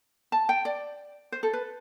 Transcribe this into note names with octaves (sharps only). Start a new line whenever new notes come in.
A5
G5
D5
C5
A4
B4